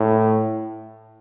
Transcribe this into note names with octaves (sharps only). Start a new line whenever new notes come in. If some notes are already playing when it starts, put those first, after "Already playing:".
Already playing: A2